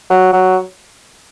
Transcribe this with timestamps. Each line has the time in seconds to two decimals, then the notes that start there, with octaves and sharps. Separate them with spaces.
0.10 F#3
0.33 F#3